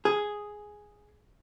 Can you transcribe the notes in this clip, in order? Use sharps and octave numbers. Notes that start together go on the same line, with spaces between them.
G#4